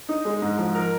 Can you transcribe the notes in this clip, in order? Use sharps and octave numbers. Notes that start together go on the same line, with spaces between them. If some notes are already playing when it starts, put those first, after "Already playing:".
D#4
G#3
G#2
F3
A#4